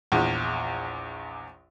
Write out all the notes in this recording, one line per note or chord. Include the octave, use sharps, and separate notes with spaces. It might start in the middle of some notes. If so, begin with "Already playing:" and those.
A#1 E2